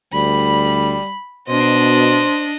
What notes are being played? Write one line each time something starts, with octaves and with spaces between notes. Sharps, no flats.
D2 G3 B5
B2 D4 C5 D#5